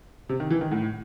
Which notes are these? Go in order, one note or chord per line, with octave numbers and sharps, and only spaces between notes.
C3
D#3
E3
D#3
A2